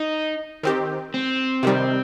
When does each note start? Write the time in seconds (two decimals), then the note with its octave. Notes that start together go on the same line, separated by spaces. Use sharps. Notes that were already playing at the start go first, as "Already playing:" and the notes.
Already playing: D#4
0.63 D#3 C4 G4
1.14 C4
1.63 C3 D#3 G3